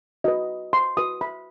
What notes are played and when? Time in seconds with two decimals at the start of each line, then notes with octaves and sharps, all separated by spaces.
0.24 F#4 B4 D#5
0.73 C6
0.97 F#4 B4 D#6
1.21 B5